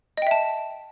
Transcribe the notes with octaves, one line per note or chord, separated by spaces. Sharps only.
D#5 E5 G5 A5